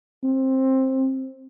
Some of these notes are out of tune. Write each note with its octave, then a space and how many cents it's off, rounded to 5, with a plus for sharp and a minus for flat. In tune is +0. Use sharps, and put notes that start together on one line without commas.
C4 +15